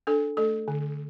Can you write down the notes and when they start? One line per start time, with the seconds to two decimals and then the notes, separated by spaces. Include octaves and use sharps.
0.07 D4 A4
0.37 A3 A4
0.68 D3